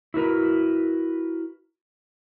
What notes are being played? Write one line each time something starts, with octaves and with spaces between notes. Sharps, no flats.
E4 F#4 A#4 B4